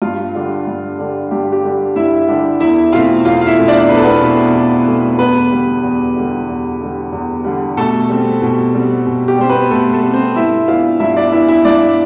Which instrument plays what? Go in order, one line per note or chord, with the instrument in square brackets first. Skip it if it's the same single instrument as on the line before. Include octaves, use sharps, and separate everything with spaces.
[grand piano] G2 F4
D3 G3 D4
G2
D3 G3 D4
G2 G4
G4
D3 G3 D4
G2 E4 E5
D3 G3 D4
E2 E4 E5
B2 A3 C4 F4 F5
E2 F4 F5
F5
E4 E5
B2 A3 C4
D4 D5
E2 B4
A4
B3 B4
B2 A3 C4
E2
B2 A3 C4
E2 B3 B4
D3 G3
E2
D3 G3
E2
D3 G3
E2
D3 G3
B2 A3 A4
G3 C4
B2
G3 C4
B2
G4
G3 C4 C5
B3 B4
B2 A3 A4
A3 A4
G3 C4
C4 C5
G2 E4 E5
E3 B3 D4 F4 F5
G2 E4 E5
D4 D5
E3 B3 D4 E4 E5
E4 E5
G2 D4 D5